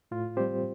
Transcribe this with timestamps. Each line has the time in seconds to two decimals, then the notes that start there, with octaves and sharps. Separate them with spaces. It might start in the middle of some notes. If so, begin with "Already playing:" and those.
0.11 A2 F4
0.37 G3 C4 G4 C5